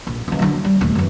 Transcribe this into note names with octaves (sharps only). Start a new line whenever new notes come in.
A#1
C#2 E3
D3 F#3
G3
D#1 A3
F#2 E3